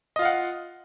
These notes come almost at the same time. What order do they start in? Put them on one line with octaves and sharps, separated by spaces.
D#5 F4 F5 F#5